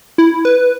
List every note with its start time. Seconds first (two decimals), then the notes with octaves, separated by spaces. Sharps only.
0.18 E4
0.45 B4